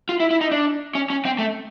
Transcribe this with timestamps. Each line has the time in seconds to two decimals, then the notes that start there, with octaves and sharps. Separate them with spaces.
0.09 F4
0.20 E4
0.30 E4
0.41 D#4
0.51 D4
0.95 C#4
1.10 C#4
1.25 C4
1.39 A3